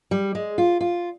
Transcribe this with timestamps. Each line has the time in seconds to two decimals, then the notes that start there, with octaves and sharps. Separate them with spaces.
0.11 G3
0.35 G#3
0.58 F4
0.81 F4